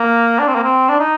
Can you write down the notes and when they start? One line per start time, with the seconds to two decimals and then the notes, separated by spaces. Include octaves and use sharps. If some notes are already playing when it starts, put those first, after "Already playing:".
Already playing: A#3
0.39 D4
0.48 C4
0.55 A#3
0.63 C4
0.89 D4
0.99 D#4